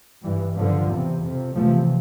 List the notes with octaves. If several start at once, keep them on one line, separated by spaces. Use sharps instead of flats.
G2 E3 G3
G2 D3 F3
E2 C3
F2 C3
E2 C3 F3 A3